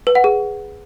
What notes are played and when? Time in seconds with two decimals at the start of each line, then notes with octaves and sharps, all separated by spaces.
0.07 B4
0.15 F#5
0.24 G#4